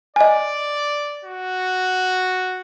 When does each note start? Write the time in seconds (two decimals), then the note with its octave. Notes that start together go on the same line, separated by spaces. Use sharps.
0.16 D5 D#5 G#5
1.24 F#4